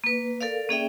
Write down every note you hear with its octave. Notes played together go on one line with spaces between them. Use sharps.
A#3 B4
A4 A#4 D5 F5
A#3 C#4 G#4 D5 E5 G5